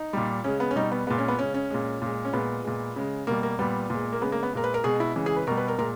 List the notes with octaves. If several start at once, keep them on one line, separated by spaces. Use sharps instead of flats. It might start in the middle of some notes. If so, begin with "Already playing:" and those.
Already playing: D#4
A#2 G3
C#3 G#3 C#4
B3
C#4
B2 G3 D#4
B3
A#2 G#3 B3
C#4
B3
C#3 G#3 C#4
C#4
A#2 G#3
A#2 G#3
C#4
A#2 G#3 B3
A#2 G#3
C#3 G#3
B2 G3 A#3
A#3
A#2 G3 B3
A#2 G#3
A#3
C#3 G#3 B3
A#3
B3
A#2 G#3 A#4
B4
A#4
B2 G#3 G#4
E4
C#3 E3 G#3
G#4
B4
B2 G3 A#4
B4
A#4
A#2 G#3 A#4